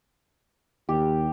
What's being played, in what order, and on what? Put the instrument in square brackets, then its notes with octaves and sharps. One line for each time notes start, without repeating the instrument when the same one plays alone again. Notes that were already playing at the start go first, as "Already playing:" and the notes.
[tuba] D#2 [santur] G4